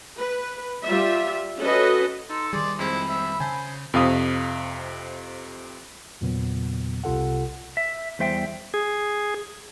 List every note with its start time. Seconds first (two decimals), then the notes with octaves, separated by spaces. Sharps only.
0.16 B4
0.83 G3 F4 E5
1.59 C#4 F#4 A4 B4 D#5
2.30 D#4 A4 C6
2.53 D#3 G3 G#4 D5 C6
2.79 F2 G#3 C4 E4 B5
3.09 E5
3.40 C#3 C5 G#5 A5
3.94 F2 C3 F5 D#6
6.21 E2 A#2 C#3 F#3 B3
7.04 C2 C3 F4 A4 F#5
7.77 E5
8.19 E2 G3 C5 E5 G5
8.74 G#4